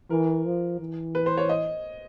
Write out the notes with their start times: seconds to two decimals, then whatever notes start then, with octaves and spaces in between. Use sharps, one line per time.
0.10 E3 A#4
0.46 F3
0.80 E3
1.15 B4
1.26 C5
1.38 C#5
1.49 D#5